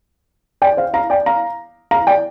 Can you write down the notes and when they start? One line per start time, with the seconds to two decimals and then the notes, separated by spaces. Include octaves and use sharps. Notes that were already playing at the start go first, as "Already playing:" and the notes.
0.62 D5 G5
0.77 C5 F5
0.94 F5 A#5
1.10 D5 G5
1.26 F5 A#5
1.91 F5 A#5
2.07 D5 G5